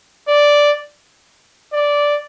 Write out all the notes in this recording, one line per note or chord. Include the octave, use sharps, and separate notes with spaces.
D5
D5